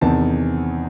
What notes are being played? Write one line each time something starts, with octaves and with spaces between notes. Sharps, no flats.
E2 C3 D#3 A5